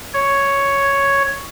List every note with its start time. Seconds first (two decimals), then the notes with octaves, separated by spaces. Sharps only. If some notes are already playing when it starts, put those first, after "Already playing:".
0.14 C#5